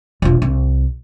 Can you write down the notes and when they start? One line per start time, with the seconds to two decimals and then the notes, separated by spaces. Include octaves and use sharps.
0.22 E1 F4
0.42 C2